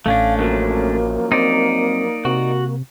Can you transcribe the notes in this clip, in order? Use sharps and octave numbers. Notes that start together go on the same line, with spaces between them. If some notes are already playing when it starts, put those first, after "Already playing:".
A1 A3 C#4 D4 F5
F#2 F3 F#3 A#3
C4 D#4 D5
C3 F#4